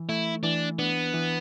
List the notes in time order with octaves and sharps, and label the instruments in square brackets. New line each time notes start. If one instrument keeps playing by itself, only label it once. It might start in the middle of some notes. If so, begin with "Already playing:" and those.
Already playing: [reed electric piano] E3
[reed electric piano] A3 [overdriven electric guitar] E4
[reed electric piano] E3 [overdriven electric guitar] D4
[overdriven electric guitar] B3 [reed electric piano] D4
[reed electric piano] E3